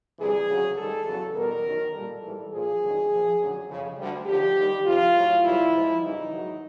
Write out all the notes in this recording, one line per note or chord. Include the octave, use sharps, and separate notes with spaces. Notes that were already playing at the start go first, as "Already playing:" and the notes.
D2 C3 E3 G3 G#4
D2 C#3 F#3
G#2 D#3 G3 A4
E2 C#3 F#3
E2 B2 G3 A#4
F#2 D#3 F#3
A#2 G3 A4
G#2 E3 G3
A#2 F3 G#4
D2 C3 D#3 F#3
A#2 F3
F#2 D3 F#3
F2 C#3 F3
D2 D3 G3
D#2 D3 F3 G4
D#2 D#3 G3
F2 C3 F3 F4
A2 F#3
F#2 C#3 E3 G3 E4
G#2 F3
F2 C#3 E3 G3 D#4
G#2 D#3 F#3